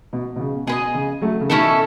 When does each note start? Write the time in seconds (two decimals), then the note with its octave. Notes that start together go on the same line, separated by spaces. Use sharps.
0.13 B2
0.36 B2
0.40 C#3
0.67 B2 G#4 B4
0.72 D#5
0.95 C#3
1.21 F#3 A3
1.41 C#3
1.49 B2 D#3 A3 C#4 E4 A4